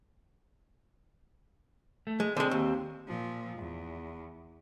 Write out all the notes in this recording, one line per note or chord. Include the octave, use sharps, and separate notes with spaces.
A3
G#3
D3 G#3 C4
D#2
A#2 F3
E2